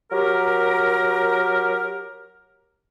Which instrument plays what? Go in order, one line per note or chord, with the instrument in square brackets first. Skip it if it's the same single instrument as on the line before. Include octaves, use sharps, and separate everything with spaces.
[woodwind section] F#3 G4 A#4